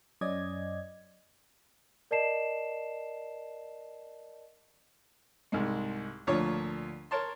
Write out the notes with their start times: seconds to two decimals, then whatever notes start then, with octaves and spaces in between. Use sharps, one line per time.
0.21 F#2 C#4 D5 D#5 G#6
2.11 A#4 D5 D#5 A5 C7 E7
5.52 C2 G#2 G#3
6.27 D2 A#2 F3 C#5 C#6
7.11 A#4 C#5 A5 C6